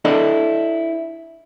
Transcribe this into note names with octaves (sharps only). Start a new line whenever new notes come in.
D4 E4 A4 D5 D#5